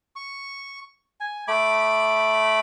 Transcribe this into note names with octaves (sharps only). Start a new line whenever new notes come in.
C#6
G#5
A3 B5 D6